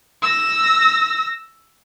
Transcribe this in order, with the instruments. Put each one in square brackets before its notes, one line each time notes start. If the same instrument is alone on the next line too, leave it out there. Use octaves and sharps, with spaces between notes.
[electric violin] E6 A#6